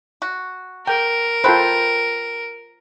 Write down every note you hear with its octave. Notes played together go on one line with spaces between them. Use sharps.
F#4
A#4 G5
F4 A4 B4 C5 G5